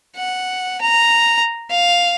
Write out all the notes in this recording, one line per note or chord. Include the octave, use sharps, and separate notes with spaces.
F#5
A#5
F5